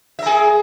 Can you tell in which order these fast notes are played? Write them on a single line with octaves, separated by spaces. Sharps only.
E5 A#4 G#4